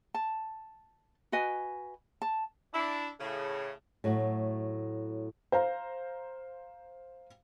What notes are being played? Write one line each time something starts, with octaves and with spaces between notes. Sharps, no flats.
A5
F#4 B4 D#5 G#5
A5
D4 E4
A2 C#3
A2 F#3 A3 F#4
C5 F5 A#5